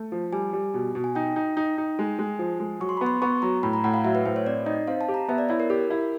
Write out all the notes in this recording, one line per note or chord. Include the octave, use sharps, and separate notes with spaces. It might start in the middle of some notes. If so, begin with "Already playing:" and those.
Already playing: A3
F3
G3 G#5
G3
B2
B2
G#5
D#4 G5
D#4
D#4
D#4
G#3
G#3
F3
G#3
F#3 C#6
C6
B5
B3
C6
B3 C#6
F#3 A#5
A2 B5
A#5
A2 F#5
F5
F#3 E5
B4
A2 C5
C#5
C4 D5
D#4 D#5
C4 F5
A5
G4
A#5
B3 E5
D5
E4 C#5
A#4
G4 A#4
E4